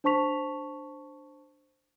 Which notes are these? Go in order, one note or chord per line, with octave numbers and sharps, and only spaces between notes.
D4 C5 A5 C#6 B6 F7